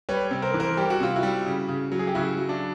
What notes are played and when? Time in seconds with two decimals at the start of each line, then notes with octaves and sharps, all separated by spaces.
0.09 G3 B4 C#5
0.31 C3
0.42 A#4 C5
0.54 E3
0.60 A#4 C5
0.77 G3 G4
0.90 F#4
1.00 C3 F4
1.16 E4 F#4
1.23 G3
1.46 C#3
1.68 C#3
1.92 F#3
1.99 G#4
2.07 G4
2.15 C#3 E4 F#4
2.38 F#3
2.49 D4